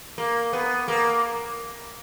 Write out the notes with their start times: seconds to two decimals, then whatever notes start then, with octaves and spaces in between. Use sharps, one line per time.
0.18 A#3
0.53 B3
0.88 A#3